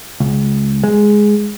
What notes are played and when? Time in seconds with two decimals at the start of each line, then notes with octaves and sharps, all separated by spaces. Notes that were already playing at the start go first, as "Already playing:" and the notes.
0.20 C#2
0.84 G#3